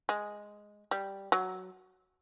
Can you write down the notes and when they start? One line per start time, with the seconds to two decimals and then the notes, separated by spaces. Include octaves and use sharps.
0.09 G#3
0.91 G3
1.32 F#3